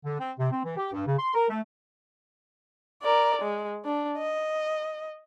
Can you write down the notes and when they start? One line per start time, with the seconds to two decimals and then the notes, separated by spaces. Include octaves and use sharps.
0.05 D3
0.20 C4
0.39 C3
0.52 C4
0.64 E3
0.77 G4
0.93 G2
1.07 C#3
1.19 C6
1.34 A#4
1.49 A3
3.03 A#4 D5
3.42 G#3
3.85 D4
4.18 D#5